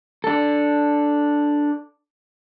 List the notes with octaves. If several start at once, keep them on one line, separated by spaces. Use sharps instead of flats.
D4 A4